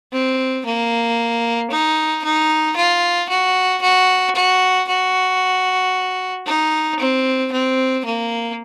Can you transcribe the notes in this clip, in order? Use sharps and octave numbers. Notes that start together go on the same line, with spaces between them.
C4
A#3
D#4
D#4
F4
F#4
F#4
F#4
F#4
D#4
C4
C4
A#3